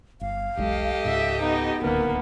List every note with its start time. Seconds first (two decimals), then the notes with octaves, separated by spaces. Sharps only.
0.21 G1 F5
0.57 E1 B1 G#3 G4 A4 D#5
1.05 C#2 G#2 E5
1.41 B3 D#4
1.81 D1 C#2 D3 A#3 B3 A#4